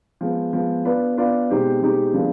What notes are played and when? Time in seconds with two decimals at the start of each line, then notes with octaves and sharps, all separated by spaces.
0.21 F3 G#3 B3
0.53 F3 G#3 B3
0.85 B3 D4 F4 B4 D5
1.17 B3 D4 F4 B4 D5
1.50 B2 G#3 C4 D#4 G4
1.82 B2 G#3 C4 D#4 G4
2.13 D3 F3 G#3 B3